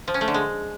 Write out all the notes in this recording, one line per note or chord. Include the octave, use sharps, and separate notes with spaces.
F3
C#4
A3
D3
G#3